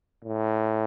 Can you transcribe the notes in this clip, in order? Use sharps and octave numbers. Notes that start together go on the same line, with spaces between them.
A2